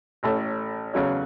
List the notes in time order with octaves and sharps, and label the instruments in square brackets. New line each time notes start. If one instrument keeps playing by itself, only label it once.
[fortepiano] A1 A2 A3 C#4
E2 C#3 F#3 A3 C#4